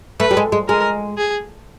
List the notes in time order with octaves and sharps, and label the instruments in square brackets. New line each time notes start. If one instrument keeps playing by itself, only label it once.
[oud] A3 [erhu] B4
[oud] G3
G#3
G#3
[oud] G#3 [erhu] A#4
[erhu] G#4